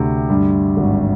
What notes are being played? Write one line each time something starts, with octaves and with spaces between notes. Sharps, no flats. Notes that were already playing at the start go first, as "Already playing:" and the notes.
Already playing: D2 C3
G2
G#1